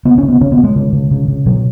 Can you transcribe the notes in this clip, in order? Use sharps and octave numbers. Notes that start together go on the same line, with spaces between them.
C#3 B3
C#3 C#4
B3
C#3 C#4
B3
C#3
G#3
C#3
C#3
C#3
C#3
B2 F#3